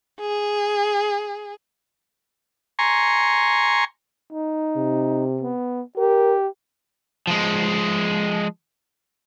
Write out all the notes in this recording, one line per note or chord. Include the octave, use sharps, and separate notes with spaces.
G#4
G#5 A#5 C6 C#6
D#4
C3
B3
G4 A#4
F3 G#3